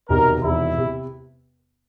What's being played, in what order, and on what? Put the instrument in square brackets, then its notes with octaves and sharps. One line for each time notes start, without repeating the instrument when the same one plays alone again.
[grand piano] E1 E2 C3 D#3 [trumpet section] A#4
[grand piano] E1 E2 C3 D#3 [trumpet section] E4
[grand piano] C3